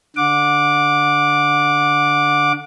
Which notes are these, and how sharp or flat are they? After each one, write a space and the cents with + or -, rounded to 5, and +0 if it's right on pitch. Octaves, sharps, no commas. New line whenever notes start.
D3 +0 F#5 -30 D6 +0